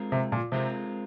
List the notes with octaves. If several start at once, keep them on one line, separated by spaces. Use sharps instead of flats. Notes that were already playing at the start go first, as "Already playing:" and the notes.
Already playing: G#3 C4 F4 A#4
C3
A#2
C3 G#3 C4 F4 A#4